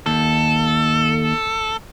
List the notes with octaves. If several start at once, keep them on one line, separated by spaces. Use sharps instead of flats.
D#2 A4